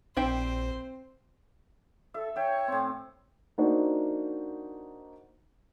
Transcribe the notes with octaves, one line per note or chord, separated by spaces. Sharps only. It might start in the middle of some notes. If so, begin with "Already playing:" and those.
A#1 C4 E4 G4 C5 G5
A4 E5
C#5 E5 G5
A2 C4
A#3 D4 D#4 F#4 C5